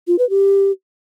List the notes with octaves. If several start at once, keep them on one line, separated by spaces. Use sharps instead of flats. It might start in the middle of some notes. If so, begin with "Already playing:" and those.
F4
B4
G4